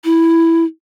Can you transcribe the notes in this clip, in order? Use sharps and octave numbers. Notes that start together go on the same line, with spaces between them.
E4